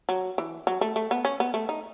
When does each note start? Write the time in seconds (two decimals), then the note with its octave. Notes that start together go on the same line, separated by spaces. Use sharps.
0.09 F#3
0.38 E3
0.67 F#3
0.81 A3
0.96 A3
1.11 B3
1.25 C#4
1.40 B3
1.54 A3
1.69 D#4